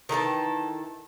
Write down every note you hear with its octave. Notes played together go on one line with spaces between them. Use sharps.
D#3 E3 A4 A5